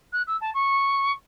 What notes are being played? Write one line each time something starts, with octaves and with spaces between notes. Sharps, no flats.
F#6
E6
A5
C#6